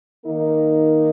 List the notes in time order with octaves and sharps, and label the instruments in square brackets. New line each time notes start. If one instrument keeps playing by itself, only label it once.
[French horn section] D#3 A#3 D#4 A#4